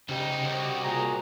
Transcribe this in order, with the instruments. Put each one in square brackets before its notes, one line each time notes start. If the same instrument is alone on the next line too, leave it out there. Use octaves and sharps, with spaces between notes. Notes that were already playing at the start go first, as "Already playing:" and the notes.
[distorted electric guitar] D2 D#4 [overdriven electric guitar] C#3 [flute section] G4 D#5
[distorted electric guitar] C2 [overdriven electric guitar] F#4 F#5
[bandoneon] A#2 G#4 A#5